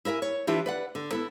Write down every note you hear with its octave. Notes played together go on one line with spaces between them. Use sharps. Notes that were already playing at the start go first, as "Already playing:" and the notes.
E4 A#4 D#5 E5 G#5
C#5
E3 D4 E4 F4 G4
B4 D5 F#5
D3
B3 E4 A4